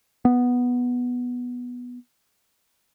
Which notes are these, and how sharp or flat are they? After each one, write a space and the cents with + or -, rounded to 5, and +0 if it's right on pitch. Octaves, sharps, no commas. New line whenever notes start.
B3 -5